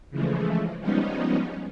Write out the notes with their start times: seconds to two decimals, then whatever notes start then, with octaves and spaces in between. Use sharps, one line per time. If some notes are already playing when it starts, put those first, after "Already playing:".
0.11 C#3 E3 F3 G#3 A3
0.80 F3 G3 G#3 B3 C#4 D#4